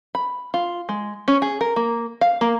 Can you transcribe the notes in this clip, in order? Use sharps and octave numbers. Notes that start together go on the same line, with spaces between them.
B5
F4
G#3
C#4
G#4
A#4
A#3
F5
A#3